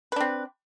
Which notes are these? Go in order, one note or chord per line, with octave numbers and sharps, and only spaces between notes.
C4 D4 B4